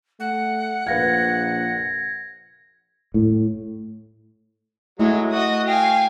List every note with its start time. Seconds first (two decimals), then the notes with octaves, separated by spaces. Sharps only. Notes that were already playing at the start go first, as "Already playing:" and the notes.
0.20 A3 F#5
0.87 A#1 B4 F5 G#6 A#6
3.14 A2
4.99 F#3 G#3 A3 E4
5.32 F#4 D#5 D#6
5.68 F5 G5 G#5